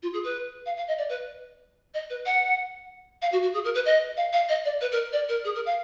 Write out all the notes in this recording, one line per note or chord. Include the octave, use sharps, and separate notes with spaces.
F4
G#4
B4
F5
F5
D#5
D5
B4
D#5
B4
F#5
F5
F#4
F#4
G#4
A#4
B4
D#5
F5
F5
D#5
D5
B4
A#4
D5
A#4
G#4
A#4
F5